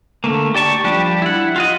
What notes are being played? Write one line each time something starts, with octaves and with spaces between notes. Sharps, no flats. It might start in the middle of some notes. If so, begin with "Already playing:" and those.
D3 A3 A#3
G4 D5 A5 C#6
F3 G3 D4 G4
E4 F#5
F4 F#4 D#5